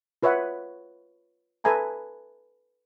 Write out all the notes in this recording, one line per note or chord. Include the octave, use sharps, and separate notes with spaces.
F4 B4 C#5 E5 F#5
A4 B4 E5 G#5 A#5 B5